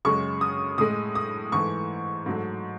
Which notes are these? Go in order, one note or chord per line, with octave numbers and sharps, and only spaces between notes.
F#2 C#3 G#3 C#6
D#6
A2 G#3 D#6
D#6
G#2 E3 A3 C#6
G#2 F#3 A3